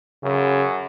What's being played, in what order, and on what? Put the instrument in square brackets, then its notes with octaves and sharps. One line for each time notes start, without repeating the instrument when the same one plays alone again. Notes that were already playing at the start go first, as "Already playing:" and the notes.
[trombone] F#2 [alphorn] C#3